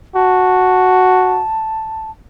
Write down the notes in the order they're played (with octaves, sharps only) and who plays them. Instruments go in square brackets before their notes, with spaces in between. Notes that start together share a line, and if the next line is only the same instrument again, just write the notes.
[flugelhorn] F#4 [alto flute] A5